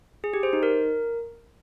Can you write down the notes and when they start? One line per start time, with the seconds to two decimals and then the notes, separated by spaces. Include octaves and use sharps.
0.24 G#4
0.33 G4
0.43 C5
0.53 D#4
0.63 A#4